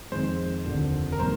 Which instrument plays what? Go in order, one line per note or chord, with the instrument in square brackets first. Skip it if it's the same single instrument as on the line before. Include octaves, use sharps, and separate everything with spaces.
[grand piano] F2 D#3 G#3 D#4 [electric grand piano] C5
[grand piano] F1 D#2 D3 F3
[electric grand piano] A#4
[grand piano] C3 D#3 G3 A#3 [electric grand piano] C5